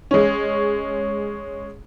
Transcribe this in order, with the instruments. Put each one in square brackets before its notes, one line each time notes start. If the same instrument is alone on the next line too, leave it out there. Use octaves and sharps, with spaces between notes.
[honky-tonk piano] G#3 C#4